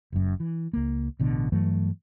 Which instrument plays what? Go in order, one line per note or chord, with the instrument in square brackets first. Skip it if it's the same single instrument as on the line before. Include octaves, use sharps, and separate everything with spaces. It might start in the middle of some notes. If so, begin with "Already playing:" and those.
[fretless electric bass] F#1 F#2
E3
C#2 A#3
A1 B2 D3
G2 E3 F#3 A3